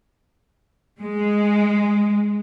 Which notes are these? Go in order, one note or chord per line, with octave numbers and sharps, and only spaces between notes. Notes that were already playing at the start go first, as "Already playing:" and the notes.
G#3